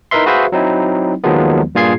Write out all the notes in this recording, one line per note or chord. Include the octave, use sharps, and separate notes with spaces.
D#4 E4 A#4 B4 E5 C6
F#4 G#4 B4 C5 E5 F5
F#3 C4 D#4 E4
D#2 D#3 F3 F#3 G#3 B3
G2 A#2 F4 G#4 G#6 C7